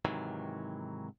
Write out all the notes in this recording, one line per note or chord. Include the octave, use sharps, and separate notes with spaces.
G#2 C3 D#3 E3 F#3